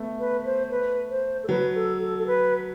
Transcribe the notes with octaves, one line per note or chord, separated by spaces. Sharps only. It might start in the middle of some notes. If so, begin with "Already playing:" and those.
Already playing: A3 B3
B4
C5
B4
C5
A4
F#3 B4
A4
A4
A4
B4